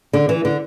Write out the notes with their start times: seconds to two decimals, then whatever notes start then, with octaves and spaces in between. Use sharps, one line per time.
0.13 D3
0.29 E3
0.45 D3